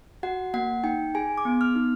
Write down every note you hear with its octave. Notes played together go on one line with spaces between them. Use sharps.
F#4 F#5
A#3 F#5
D#4 G5
G#4 G#5
D6
B3
F6
D#4